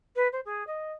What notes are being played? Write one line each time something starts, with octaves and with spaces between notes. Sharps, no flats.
B4
C5
G#4
D#5